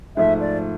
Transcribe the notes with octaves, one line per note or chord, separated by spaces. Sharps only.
G#2 F3 A3 E5
D5